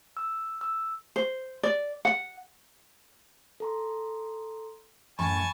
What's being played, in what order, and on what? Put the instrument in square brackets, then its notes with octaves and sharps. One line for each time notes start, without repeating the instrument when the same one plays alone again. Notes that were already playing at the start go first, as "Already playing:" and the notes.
[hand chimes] E6
E6
[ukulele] C5
D5
F#5
[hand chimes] A4 A#5 C6
[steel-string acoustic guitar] F#2 A2 [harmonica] G#5 A5 C#6 [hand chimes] B5